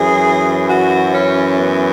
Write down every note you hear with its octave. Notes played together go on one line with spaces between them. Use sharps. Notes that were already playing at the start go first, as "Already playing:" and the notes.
Already playing: F#2 E3 G#4
F#4
C#4
B3